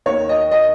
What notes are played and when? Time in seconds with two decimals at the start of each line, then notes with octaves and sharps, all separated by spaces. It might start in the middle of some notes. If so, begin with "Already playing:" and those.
0.06 D#2 D#3 C#5
0.29 D#5
0.51 D#5